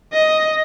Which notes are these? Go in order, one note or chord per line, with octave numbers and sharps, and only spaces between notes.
D#5